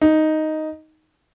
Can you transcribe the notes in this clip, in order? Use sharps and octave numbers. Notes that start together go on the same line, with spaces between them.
D#4